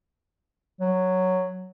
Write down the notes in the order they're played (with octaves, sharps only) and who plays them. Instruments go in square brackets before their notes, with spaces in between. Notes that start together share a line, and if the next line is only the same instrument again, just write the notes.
[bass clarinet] F#3